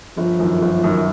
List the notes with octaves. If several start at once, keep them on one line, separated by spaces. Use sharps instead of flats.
G1 F3
F#2 D#3
G1
F#2 D#3